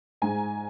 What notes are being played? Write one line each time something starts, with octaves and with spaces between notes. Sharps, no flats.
G#2 G#5 A#5